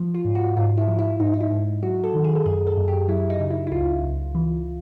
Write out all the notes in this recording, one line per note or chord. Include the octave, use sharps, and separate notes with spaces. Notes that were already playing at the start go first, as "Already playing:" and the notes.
Already playing: F3
F4
G#2
F#4
G#2 F4
E4
F3
E4
G#2 D#4
D#4
E4
G#2
F#3 F#4
A4
D#3
G#4
A4
F#2 G#4
A4
F#2
G4
F#3 E4
D#4
C#3
E4
E4
C#2 F4
C#2
E3